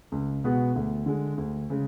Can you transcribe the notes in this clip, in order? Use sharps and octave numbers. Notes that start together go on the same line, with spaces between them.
C#2
B2 G#3 B3 F#4
D2
D3 G#3
D2
C#3 G#3